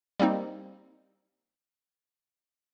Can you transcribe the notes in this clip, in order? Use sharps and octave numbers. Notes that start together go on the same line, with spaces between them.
G3 A#3 C4 D#4